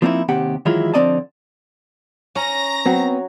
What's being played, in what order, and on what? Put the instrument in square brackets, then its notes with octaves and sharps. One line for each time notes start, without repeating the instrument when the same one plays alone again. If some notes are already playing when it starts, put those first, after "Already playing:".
[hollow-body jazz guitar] F3 A#3 C4 D#4 E4
D#2 C3 G4 F#5
D#3 E3 F#3 G#3 E4 F4
D3 F3 C4 D5 D#5 A5
[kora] C#4 [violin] A#5 A#6
[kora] F#3 [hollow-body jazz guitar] B3 C4